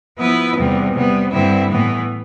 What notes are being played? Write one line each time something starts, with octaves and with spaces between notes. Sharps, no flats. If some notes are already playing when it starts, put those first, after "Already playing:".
F3 B3 E4 B4
E2 C3 G3
C3 G3 B3
G2 D3 G3 C4 E4
A2 E3 B3